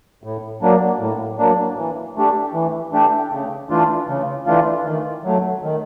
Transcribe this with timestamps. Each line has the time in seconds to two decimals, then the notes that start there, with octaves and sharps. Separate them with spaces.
0.24 A2
0.62 F#3 A#3 D4
0.99 A2
1.39 F#3 A#3 D4
1.77 E3
2.16 A3 D4 G4
2.54 E3
2.93 A3 D4 G4
3.32 C#3
3.70 E3 A3 D4 F4
4.08 C#3
4.47 E3 A3 D4 F4
4.85 D#3
5.24 F#3 A3
5.63 D#3